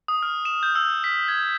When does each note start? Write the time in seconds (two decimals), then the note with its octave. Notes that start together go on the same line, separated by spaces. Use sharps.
0.08 D#6
0.22 F6
0.45 E7
0.63 G6
0.75 E6
1.04 B6
1.28 G#6